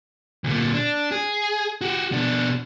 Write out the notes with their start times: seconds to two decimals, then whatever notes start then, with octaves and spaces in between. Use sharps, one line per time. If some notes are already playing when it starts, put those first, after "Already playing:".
0.44 D2 A#2
0.74 D4
1.11 G#4
1.81 F#4 G4
2.12 B2 D4